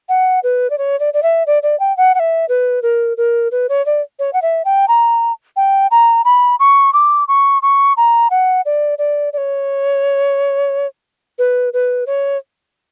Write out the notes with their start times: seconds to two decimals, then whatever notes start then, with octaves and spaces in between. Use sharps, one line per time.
0.09 F#5
0.43 B4
0.70 D5
0.78 C#5
1.00 D5
1.14 D5
1.23 E5
1.47 D5
1.63 D5
1.80 G5
1.97 F#5
2.15 F#5
2.19 E5
2.49 B4
2.82 A#4
3.17 A#4
3.51 B4
3.69 C#5
3.86 D5
4.19 C#5
4.33 F#5
4.42 E5
4.65 G5
4.88 A#5
5.56 G5
5.91 A#5
6.25 B5
6.59 C#6
6.93 D6
7.28 C#6
7.62 C#6
7.97 A#5
8.30 F#5
8.65 D5
8.98 D5
9.33 D5
9.37 C#5
11.38 B4
11.73 B4
12.06 C#5